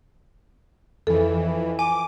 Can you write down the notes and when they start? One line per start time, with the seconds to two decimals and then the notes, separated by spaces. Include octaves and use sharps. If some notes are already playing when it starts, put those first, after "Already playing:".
1.07 F2 E3 A4
1.79 G#5 D6